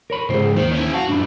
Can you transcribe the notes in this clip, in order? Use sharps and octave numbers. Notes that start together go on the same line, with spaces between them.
A#4 C#5 B5
C#2 G#2 G#4 C5
D#2 D#3 C5
C#4 E4
F#4 F5 A5
F#2 A2 D4 B5